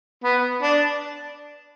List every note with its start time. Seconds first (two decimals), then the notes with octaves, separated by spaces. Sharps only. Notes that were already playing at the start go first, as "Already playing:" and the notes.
0.24 B3
0.62 D4